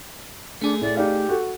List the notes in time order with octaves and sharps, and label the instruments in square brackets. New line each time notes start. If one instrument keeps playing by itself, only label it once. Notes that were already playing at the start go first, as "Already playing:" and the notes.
[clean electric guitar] A3 G#4 [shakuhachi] D4
[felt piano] A2 [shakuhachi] D5
[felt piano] D#4 D5 F5 [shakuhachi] G4
[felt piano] F#4 A4